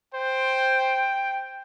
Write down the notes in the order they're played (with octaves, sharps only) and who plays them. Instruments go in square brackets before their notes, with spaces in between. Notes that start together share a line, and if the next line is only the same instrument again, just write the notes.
[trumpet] C5 [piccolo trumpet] G5